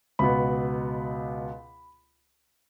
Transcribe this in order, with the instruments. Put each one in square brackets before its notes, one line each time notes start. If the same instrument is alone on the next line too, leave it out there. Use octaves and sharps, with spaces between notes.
[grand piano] C#2 B2 B3 B5